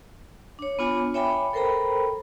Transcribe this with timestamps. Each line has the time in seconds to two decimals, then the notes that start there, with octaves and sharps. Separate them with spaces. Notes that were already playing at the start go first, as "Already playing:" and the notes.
0.59 D4 C#5
0.79 B3 D4 F4 C#5 G#5
1.14 C#5 E5 G5 G#5 B5 D6
1.53 A4 A#4 C5 G5 A#5 B5